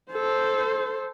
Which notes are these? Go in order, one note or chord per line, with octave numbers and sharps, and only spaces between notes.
A4 C5